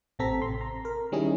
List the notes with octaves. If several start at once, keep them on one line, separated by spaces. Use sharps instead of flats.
A1 C3 C4 A4 A#5 B6
C6
A#5
A#4
D#3 G3 C#4 D#4 E4 G#4